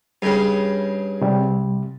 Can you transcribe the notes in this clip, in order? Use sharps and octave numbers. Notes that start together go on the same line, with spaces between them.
G2 C#3
C3 G3